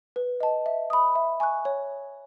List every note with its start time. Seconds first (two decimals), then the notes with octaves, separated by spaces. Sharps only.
0.16 B4
0.40 D#5 A5
0.66 E5
0.90 B5 D#6
1.15 E5
1.40 G#5 C#6 F#6
1.65 C#5